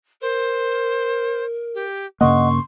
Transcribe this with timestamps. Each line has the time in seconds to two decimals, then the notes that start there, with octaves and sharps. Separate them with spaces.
0.21 A#4 C5
1.75 G4
2.21 G2 C#3 A#3 D#5 F#5 C6 C#6